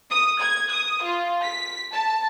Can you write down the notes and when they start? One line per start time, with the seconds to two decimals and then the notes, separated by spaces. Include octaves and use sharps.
0.10 D#6
0.40 G#6
0.70 D#6
1.03 F4
1.42 B6
1.92 A5